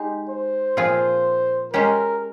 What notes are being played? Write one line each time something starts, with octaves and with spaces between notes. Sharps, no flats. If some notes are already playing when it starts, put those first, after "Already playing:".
Already playing: G#3 D#4 G4
C5
A#2 F3 C4 F4 G#4
G#3 C#4 G4 A#4